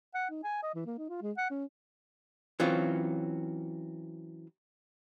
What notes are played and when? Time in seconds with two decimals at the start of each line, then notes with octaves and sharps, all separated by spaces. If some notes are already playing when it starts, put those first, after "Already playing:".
0.14 F#5
0.30 D#4
0.43 G#5
0.63 D#5
0.75 E3
0.86 A#3
0.98 D#4
1.09 F4
1.22 G#3
1.37 F#5
1.50 C#4
2.60 E3 F#3 C4 C#4 F4